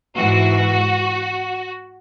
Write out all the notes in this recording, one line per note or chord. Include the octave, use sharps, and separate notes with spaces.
G#2 E3 F#4